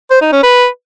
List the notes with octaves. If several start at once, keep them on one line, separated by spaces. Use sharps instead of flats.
C5
D#4
C#4
B4